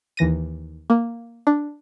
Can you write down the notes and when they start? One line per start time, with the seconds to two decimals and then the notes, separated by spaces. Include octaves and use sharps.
0.17 D#2 E3 A#6 D#7
0.90 A#3
1.47 D4